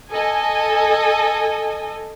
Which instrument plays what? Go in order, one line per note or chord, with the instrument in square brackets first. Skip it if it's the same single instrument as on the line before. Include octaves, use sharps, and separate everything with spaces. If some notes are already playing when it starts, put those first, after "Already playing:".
[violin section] A4 D#5 G#5